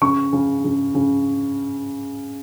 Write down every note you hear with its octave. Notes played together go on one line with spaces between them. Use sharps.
C#3 C#6
C#3
C#3
C#3